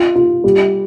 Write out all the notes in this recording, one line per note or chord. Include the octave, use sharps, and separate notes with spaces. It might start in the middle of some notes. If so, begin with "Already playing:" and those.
Already playing: F4
F4
G3